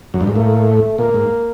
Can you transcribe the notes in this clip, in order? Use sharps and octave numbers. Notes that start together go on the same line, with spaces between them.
F#2
G2
G#2
A2 A#3
A3
A#2 A#3
G#2